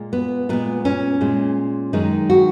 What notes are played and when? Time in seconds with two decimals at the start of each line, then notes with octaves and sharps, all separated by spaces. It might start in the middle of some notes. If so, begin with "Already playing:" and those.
Already playing: A#2 G#3
0.13 B3
0.49 A#2 G#3 B3
0.85 C#4
1.21 A#2 G#3
1.93 F#2 D#3 G#3 D#4
2.30 F#4